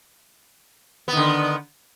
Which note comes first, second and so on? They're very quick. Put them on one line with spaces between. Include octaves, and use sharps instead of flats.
B3 D#3 D3